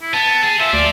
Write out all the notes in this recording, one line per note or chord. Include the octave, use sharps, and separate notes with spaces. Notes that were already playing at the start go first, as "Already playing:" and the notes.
E4
B3 A5
G#4
F3 C5 E5
D2 D5